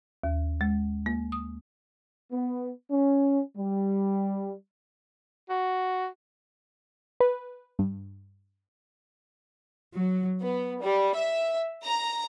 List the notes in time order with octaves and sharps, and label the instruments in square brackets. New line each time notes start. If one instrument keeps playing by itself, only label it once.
[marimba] D#2
G#3
A#3
D#6
[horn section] B3
C#4
G3
[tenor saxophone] F#4
[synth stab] B4
G2
[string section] F#3
B3
G3
E5
A#5